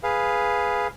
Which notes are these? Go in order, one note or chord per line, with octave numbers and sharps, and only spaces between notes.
G#4 B4 F5